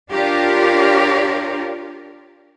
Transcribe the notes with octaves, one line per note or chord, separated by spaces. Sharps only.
D4 F4 G4 A#4 C#5 D5